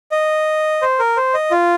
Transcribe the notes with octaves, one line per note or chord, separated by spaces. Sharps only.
D#5
C5
A#4
C5
D#5
F4